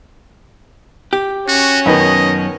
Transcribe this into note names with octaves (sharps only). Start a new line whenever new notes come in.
G4
C#4 F#4
F#2 B2 D#3 B3 D#5